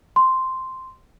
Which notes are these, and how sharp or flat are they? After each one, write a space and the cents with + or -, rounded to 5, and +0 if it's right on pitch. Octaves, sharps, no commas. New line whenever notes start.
C6 -5